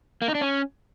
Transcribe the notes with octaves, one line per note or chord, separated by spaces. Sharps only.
A#3
D#4
D4
C#4